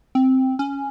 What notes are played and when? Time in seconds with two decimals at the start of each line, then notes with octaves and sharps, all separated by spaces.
0.15 C4
0.59 C#4